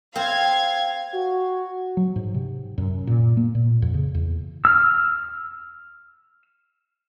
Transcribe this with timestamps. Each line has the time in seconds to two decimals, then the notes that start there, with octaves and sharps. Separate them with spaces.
0.16 C4 F5 G#6
1.15 F#4
1.97 F#3
2.16 G#2
2.34 C3
2.78 F#2
3.07 A#2
3.37 A#3
3.55 A#2
3.82 F2
3.94 C#3
4.14 E2
4.65 E6 F6